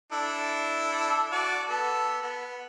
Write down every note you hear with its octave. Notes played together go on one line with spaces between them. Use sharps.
D4 E4 A4
F#4 D5 A5
B3 A4
B3